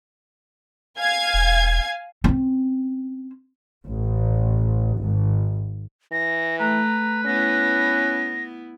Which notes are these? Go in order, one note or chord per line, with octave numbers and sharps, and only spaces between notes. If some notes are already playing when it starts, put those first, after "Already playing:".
F5 G#5 G#6
E1
C4 C#4
A1
G#1
E3 A#6
A3 B4 A#5
B3 C#4 E4 A#6